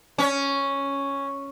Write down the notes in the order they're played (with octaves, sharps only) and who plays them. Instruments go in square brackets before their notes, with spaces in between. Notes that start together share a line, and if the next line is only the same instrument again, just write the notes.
[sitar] C#4